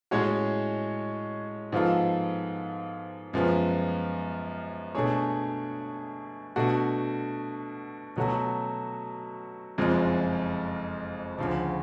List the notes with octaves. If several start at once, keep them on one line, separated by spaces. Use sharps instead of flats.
A2 G#3 C#4 F#4 C#5
G#2 F3 B3 F4 A4
F#2 F3 G#3 B3
B2 A3 D4 G#4 C#5
B2 A3 D4 F#4
B2 F#3 A3 C#4 F#4
F#1 F2 F3 G#3
D2 C#3 F3